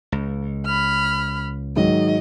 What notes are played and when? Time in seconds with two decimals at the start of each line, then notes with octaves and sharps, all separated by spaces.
0.12 C#2
0.66 B5 F6
1.76 G#2 D#3 F#3 D#5